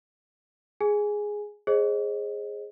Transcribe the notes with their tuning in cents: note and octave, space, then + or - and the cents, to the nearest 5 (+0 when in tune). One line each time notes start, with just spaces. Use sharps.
G#4 +0 G#5 +0
G#4 +0 C5 +40 D#5 +0